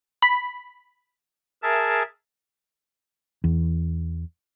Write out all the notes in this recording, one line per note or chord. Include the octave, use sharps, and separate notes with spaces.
B5
G#4 A#4 E5 A5
E2